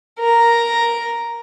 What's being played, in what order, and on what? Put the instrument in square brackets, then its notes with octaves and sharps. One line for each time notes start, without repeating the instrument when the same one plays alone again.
[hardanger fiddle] A#4